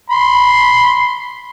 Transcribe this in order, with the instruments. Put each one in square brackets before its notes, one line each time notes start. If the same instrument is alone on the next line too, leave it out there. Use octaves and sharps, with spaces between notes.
[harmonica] B5 C6